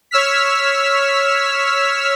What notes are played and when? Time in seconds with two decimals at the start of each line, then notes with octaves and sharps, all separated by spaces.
0.11 C#5 E6 F6 B6